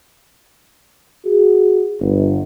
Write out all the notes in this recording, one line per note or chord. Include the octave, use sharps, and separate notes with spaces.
F#4 G#4
G1